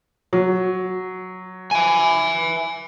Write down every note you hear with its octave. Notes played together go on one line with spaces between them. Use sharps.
F#3
E5 G#5